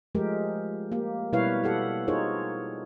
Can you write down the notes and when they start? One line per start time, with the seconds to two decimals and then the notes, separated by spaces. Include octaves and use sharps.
0.15 F3 G#3 A3 G4 A#4
0.92 A#3 G4
1.33 B2 G3 E4 B4 C#5 F5
1.64 G4 A4 F#5
2.08 D#4 F4 G#4 A#4 C5 C#5